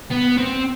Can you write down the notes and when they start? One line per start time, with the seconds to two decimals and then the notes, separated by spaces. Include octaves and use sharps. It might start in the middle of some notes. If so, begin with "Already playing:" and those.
0.10 B3
0.37 C4